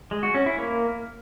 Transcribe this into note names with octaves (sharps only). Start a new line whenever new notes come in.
G#3
F#4
C#4
E4
A#3